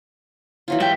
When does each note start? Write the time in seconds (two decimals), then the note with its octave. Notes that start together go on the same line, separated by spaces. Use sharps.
0.68 E3 F#3 F4
0.80 G#2 G4 E5 G5 C#6